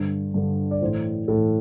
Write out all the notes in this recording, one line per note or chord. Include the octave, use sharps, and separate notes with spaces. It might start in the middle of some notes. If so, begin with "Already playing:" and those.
Already playing: G2 D3 C5
G2 D3
D5
A2 E3 C5
A2 E3 A4